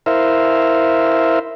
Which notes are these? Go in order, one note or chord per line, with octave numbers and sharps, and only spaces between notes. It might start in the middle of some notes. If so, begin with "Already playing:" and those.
E4 A#4 C5 E5 F5